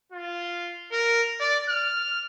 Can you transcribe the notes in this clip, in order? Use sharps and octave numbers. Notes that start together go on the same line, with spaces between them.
F4
A#4
D5
F6